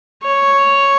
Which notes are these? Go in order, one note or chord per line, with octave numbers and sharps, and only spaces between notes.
C#5